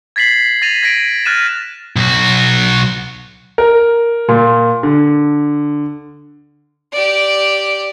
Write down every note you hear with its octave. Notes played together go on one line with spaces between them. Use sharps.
G#6 A6 B6 C7 F#7
A6 A#6 D#7 F7
G#6 A#6 B6 D7 D#7
F6 F#6 A6 D#7 E7
B1 F#4
A#4
A#2
D3
G4 D5